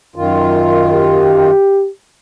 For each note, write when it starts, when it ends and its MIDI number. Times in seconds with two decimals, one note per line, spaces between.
0.16 1.51 42
0.16 1.51 51
0.16 1.51 65
0.93 1.89 67